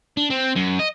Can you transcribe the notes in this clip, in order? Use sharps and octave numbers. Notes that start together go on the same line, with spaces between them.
D4
C4
F#2
D#5